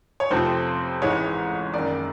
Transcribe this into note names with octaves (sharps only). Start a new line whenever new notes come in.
C#5
F2 C3 F3 A3 C4 C5
A1 G#2 E3 G#3 C#5
F#1 F#2 D#3 D5